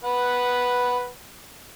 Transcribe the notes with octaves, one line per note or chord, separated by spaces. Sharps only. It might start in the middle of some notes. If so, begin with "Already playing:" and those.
B4 F#5